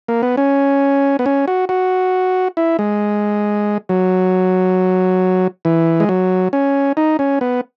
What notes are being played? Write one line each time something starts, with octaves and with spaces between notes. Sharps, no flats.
A#3
B3
C#4
B3
C#4
F#4
F#4
E4
G#3
F#3
E3
G#3
F#3
C#4
D#4
C#4
B3